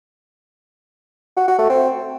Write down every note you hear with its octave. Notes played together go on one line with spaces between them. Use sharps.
F#4
F#4
A3
C4